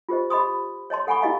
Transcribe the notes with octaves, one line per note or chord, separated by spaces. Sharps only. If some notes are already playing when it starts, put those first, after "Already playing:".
F4 G4 C5 D#5
G4 D#5 B5 C6 D#6
C#5 D#5 A5 C6
A4 F#5 G#5 B5 C#6
E4 G4 D#5 F5 A#5